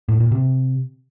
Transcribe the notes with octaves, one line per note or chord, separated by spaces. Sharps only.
A2
A#2
C3